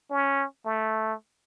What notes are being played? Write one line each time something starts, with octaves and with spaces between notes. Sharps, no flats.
C#4
A3